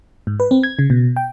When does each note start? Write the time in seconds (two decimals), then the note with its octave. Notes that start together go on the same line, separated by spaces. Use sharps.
0.27 G#2
0.40 B4
0.51 C4
0.63 G#6
0.79 C#3
0.90 B2
1.16 G5